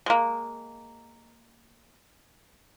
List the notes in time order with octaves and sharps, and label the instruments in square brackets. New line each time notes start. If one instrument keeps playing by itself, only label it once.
[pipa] G#3 A#3